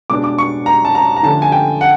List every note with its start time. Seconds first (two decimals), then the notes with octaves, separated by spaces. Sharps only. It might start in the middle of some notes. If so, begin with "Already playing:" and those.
0.10 B2 G#3 B3 D4 D6
0.24 D6
0.38 C#6
0.66 A#5
0.85 A5
0.95 A#5
1.16 A#5
1.23 D3 F3 A3 C#4 A5
1.42 G#5
1.52 G5
1.81 F#5